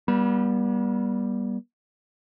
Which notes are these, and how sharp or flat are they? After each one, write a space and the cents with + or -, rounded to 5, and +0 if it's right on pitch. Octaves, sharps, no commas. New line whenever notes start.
G3 +0 B3 -40